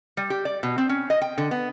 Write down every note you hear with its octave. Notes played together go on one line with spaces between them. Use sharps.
G3
G4
D5
B2
C4
C#4
D#5
G5
D3
B3